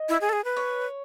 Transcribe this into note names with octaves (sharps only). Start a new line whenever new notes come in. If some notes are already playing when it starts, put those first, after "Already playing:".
Already playing: D#5
E4
G#4
A4
G#4
B4
C#5